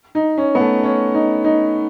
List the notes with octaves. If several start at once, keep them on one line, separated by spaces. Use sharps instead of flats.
D#4
C#4
B3
A3
C#4
D#4
D#4